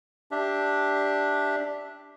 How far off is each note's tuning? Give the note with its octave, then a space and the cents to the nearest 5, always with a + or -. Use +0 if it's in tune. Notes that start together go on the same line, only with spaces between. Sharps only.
D4 +0 G4 +0 E5 +0